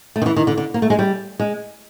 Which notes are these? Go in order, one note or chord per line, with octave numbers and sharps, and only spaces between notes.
A3
D#3
E3
D#3
D3
D3
A#3
A3
G#3
G3
G#3